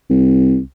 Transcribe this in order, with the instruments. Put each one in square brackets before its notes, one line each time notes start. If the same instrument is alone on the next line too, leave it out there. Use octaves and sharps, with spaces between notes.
[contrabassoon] C2